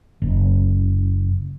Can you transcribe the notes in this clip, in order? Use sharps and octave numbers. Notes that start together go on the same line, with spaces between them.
F#1